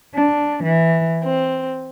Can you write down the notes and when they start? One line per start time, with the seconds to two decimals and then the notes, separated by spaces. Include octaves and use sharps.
0.14 D4
0.61 E3
1.24 C4